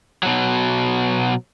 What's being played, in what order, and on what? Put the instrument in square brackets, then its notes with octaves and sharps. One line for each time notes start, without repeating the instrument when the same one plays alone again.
[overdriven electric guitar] B2 F#3